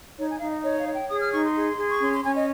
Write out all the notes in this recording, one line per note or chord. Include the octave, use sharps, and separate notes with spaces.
D#4 C#5
G#5
D#4 F5
D#5
C#5 D#5
F5
C#5
G5
G#4 D#6
F6
D#4 C#6
C6
G#4
G#4
C#6
C#4 C6
C6
C#4 G#5
D#5